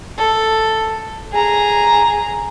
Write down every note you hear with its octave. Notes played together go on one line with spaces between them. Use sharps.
A4
G#4 A#5